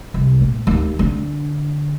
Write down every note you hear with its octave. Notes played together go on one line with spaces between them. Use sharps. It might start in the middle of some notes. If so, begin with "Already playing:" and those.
C2
A#2
D#2
D3